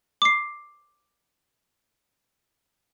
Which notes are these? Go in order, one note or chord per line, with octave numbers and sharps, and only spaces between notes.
D6 C7